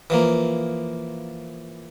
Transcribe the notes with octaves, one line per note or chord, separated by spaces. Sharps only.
E3 F3 A#3